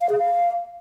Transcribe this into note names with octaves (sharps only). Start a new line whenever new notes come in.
F5
G#4
F5